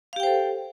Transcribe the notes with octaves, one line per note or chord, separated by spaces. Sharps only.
G4 A4 C5 F5 G5